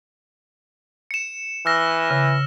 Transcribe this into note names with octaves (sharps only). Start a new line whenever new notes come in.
C#7 E7
E3 E6 F6 A#6
C#3